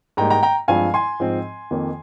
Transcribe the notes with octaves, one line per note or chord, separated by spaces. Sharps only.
G#2 G3 A#3 G5 A#5
G5 A#5
G5 A#5
G2 F3 G#3 C4 F5 G#5
G#5 C6
G#2 F3 C4
F2 D#3 A#3